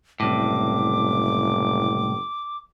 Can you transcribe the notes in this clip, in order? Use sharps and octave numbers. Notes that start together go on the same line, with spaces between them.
F#1 C2 A2 D6